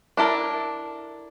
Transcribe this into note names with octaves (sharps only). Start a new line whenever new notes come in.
D4 E4 A4 A#4